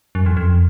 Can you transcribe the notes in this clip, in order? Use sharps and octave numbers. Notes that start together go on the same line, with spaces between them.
F#2
F2
F2